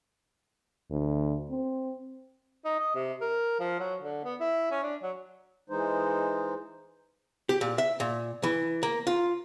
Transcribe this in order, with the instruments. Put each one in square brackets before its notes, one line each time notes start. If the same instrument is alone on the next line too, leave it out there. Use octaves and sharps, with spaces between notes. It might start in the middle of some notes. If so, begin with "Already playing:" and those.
[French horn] D2
C4
[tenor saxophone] D#4
D#5
C3
A#4
F3
F#3
D3
B3
E4
C#4
D4
F#3
[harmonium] E3 G#3 D#4 C5
[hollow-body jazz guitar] G4
A#2
E5
A#2
E3
A#3
F4